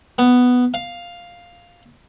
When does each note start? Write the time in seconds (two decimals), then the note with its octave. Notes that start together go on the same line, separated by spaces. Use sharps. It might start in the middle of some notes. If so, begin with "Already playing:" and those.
0.18 B3
0.74 F5